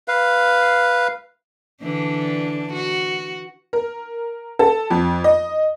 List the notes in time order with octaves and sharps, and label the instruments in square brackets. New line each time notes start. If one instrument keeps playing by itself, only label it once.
[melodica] B4 F5
[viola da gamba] D3 E3 D4
F#4
[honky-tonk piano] A#4
A4
F2
D#5